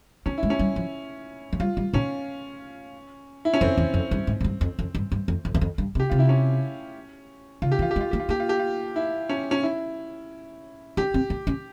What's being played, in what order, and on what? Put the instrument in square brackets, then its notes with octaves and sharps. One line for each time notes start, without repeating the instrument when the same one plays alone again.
[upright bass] C4 [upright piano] C#4
[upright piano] E4
[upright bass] G#3
[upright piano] C#4
[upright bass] G3
F3
F3
[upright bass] G3 [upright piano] F4
[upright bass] G3
[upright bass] A#2 [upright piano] C#4
[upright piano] E4
C#4
[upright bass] F2 [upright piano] C4
[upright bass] E2
F2
G2
G#2
G#2
G2
F2
F2
G2
G2
F2
F2
E2
F2
G2
C3
[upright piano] G4
[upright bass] C3 [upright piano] F4
[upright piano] E4
C#4
[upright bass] C#3 [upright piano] F4
[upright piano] G4
[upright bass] E3
[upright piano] F4
G4
[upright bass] G#3
[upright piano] F4
[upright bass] A#3 [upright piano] G4
[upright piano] F4
[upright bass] A#3 [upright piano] G4
[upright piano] F4
G4
F4
E4
C#4
C#4
E4
[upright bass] C#4 [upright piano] G4
[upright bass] C4
C4
C#4